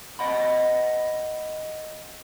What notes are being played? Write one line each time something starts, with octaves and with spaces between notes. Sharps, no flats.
D#5 F#5 B5